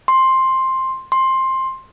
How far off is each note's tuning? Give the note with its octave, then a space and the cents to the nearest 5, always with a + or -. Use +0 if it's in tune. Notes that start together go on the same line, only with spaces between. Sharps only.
C6 +10
C6 +15